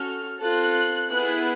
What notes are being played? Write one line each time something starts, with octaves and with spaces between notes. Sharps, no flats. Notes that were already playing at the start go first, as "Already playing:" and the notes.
Already playing: C#4 F#4 A4 F6
C4 F4 A4 F#6
B3 E4 G#4 F#6